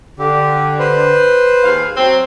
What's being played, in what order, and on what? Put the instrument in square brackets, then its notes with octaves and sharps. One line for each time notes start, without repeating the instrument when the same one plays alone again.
[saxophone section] D3 [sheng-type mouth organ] G4
[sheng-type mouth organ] B4 C5
[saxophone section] D#2 G#4 F5
F#3 C4